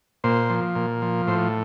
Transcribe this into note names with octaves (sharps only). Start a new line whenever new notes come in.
A#2 C5
F3
A#2
F3
A2 C5